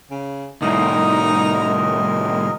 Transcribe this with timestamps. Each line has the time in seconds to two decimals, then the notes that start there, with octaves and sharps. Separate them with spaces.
0.11 C#3
0.62 C2 A2 D#4 A#4 D#5